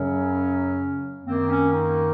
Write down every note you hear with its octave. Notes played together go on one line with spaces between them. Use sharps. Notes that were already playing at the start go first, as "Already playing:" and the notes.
Already playing: F#2 C#3 F#3 C#4
F#2 D#3 A#3 C4
C#4
D#4